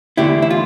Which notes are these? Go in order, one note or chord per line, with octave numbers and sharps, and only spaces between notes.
E2 D3 A3 D4 E4 G4
E4
F4